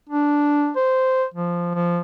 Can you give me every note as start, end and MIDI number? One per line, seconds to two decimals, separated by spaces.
0.09 0.71 62
0.76 1.24 72
1.34 1.74 53
1.74 2.01 53